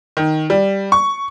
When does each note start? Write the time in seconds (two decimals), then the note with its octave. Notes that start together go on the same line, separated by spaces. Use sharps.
0.17 D#3
0.50 G3
0.92 C#6